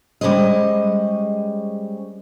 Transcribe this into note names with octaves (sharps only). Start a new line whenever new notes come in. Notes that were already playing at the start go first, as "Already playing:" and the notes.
G3 G#3 C#4 G#4 C5 D#5